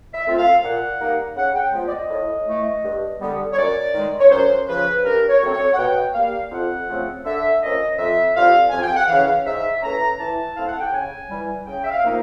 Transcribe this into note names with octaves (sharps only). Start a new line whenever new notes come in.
E5
A3 C4 F4
F5
A#2 F#5
G3 A#3 D#4
C#3 F#5
G5
F3 G#3 B3
D5
D#5
A2
E3 A3
G2
D3 G3 B3
C#5
F#2 D5
D#3 G#3
C#5
F#2 C5
C#3 F3 B4
G2 A#4
C#5
D3 F#3 A3 C4
C#5
F#5
B2 G5
G3 A#3 F5
F2 F#5
C#3 F3 A3 C4
D3 E5
F3 A#3 C#4 D#5
F2 E5
D3 G3 C4 F4 F5
F2 G#5
G5
F#5
C#3 E3 F5
G#2 E5
E3 A3 C#4 A#5
E3 A5
A3 C4 E4 F5
F#5
G5
C#3 G#5
E3 G3
C#3 G5
E5
F5
F3 A#3 D#4